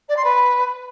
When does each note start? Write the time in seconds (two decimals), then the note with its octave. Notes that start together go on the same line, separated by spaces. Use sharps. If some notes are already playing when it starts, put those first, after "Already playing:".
0.08 D5
0.16 C6
0.24 B4